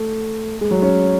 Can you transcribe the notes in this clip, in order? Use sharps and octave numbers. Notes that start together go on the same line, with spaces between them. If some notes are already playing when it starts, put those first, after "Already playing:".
Already playing: A3
G#3
F#3
C#4